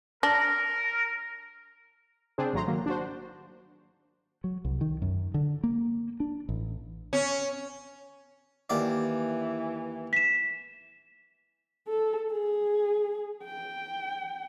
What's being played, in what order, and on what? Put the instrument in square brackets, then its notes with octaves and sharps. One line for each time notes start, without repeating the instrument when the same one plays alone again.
[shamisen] D4 [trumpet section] A#4 [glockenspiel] A#6
[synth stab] C#3 C4 D4 G#4 C5
G#1 F#3 A3 A#5 C6
D#3 F#3 A#3
D4 F#4 C5
[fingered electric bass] F#3
C2
D#3
F#2
D3
A#3
D4
A1
[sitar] C#4
[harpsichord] D#2 D5 [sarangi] E3
[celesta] B6 E7
[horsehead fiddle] A4
G#4
G5